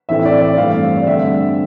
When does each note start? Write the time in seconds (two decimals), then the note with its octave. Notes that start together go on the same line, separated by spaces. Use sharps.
0.09 A2 E3 A3 C4 E5
0.25 D5
0.41 D5
0.57 G2 E3 A3 C4 F5
0.97 D5
1.06 G2 D3 A3 C4 E5